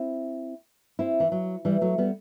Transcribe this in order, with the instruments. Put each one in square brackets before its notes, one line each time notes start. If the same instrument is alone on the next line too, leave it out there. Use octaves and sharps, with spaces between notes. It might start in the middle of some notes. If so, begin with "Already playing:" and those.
Already playing: [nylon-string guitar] C4 E4
C4 E4
E3
F#3
E3 G3
F#3 A3
G3 B3